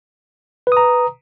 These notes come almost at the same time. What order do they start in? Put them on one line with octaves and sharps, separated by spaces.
B4 D#6 A#5